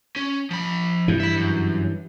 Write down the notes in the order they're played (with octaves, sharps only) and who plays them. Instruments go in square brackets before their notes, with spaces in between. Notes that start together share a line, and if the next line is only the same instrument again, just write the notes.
[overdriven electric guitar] C#4
F3 B5
[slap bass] G2 E3
[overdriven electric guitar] E5 B5
F#2